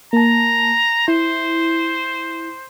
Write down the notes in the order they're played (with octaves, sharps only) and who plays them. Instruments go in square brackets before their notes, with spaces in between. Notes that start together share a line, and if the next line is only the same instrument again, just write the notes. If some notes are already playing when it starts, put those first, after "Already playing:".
[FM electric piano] A#3 A5 [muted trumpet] A#5
[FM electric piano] E4 [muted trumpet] C5